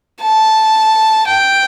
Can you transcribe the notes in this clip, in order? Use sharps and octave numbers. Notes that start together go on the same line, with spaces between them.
A5
G5